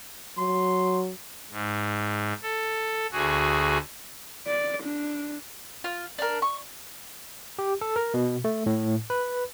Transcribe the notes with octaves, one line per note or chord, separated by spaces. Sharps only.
F#3 C6
G#2
A4
D2 F#4 G#4
D5
D4
F4
D4 A#4
C#6
G4
A4
A#4
B2
A3
A2
B4